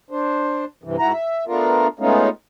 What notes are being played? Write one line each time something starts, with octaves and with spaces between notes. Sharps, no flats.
D4 C5
G2 C3 E3
G#2 E4 F#4 A#5
E5
A3 B3 D4 F4 A#4
G#3 A3 B3 C#4 D#4 F4